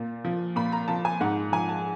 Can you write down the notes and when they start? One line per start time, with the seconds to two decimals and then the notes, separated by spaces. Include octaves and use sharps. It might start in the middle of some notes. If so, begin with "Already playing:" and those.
Already playing: A#2
0.25 F3
0.56 A#2 B5
0.72 A#5
0.88 F3 A5
1.05 G#5
1.21 G#2 F#5
1.52 F3 G#5
1.69 A5